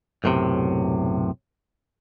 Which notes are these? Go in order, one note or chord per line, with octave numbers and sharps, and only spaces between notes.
B1 F#2 A2 C3